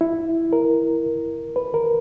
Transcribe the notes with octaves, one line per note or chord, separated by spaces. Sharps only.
E4
A#4
B4
A#4